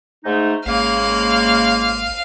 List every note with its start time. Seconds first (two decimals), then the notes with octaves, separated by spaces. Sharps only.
0.24 G#2 A3 D#4
0.66 G#1 C#3 G#3 A#3 F5